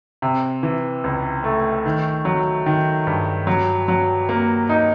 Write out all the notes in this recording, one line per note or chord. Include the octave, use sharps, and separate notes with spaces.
C3
E3
C#2
A3
D#3
F#3
D#3
G2
F#3
F#3
A#3
D#4